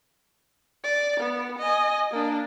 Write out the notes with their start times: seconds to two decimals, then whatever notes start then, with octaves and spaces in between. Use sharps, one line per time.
0.84 D5
1.20 B3
1.59 D#5 G#5
2.11 A#3 D4